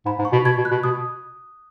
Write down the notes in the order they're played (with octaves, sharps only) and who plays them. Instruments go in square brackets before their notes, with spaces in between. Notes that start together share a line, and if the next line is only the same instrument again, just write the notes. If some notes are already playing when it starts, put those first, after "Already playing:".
[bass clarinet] G#2 [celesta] B5
[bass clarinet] G#2
[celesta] C#6
[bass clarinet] B2
[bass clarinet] B2 [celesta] G#6
[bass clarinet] B2
[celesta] F#6
[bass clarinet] B2
[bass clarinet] B2 [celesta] D#6